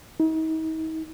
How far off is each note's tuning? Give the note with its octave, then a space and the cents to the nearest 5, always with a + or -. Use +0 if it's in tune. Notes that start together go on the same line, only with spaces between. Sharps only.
D#4 +40